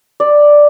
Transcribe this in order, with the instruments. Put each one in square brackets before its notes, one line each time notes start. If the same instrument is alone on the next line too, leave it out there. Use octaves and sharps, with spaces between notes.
[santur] D5